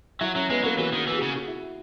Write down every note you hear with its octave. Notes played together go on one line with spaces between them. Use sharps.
F#3 E4 E5
F#3 C#4 C#5
G#3 B3 B4
F#3 A#3 A#4
E3 F#4
D#3 F#4
E3 G#4
C#3 F#4
F#4
E4